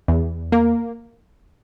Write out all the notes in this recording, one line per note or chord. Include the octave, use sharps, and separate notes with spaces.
E2
A#3